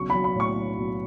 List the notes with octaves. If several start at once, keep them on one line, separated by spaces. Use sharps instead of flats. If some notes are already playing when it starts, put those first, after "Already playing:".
Already playing: B1 C#3 C#6
F#3 B5
B5
A2 C#6
F#3
B1